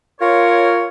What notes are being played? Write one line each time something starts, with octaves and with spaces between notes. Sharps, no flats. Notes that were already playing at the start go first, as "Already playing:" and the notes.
F4 A#4 C#5